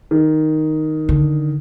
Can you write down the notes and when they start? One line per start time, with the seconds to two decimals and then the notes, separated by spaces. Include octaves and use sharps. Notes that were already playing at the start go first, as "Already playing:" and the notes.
0.11 D#3
1.09 D3